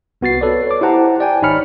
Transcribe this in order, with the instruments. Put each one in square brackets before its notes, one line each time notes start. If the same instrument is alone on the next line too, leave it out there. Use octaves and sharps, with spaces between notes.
[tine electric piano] C2 B3 F#4 A6 C7
A4 B4 C#5 D5
C#5 D6
E4 G4 C5 F#5 A5 A#5
D5 G5 G#5
G#1 D#4 C#5 B5 F6 C#7